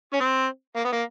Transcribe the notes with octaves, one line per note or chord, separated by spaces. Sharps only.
C#4
C4
A#3
B3
A#3